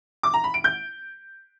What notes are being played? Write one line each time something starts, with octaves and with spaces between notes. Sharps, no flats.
D6
A#5
B5
D7
G6